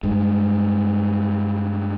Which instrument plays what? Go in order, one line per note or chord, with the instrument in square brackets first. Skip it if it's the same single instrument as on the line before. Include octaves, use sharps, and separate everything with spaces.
[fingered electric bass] G2 G#3